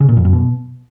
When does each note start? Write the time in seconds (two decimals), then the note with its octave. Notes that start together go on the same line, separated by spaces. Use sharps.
0.01 C#3
0.09 A#2
0.17 F2
0.25 F#2
0.33 B2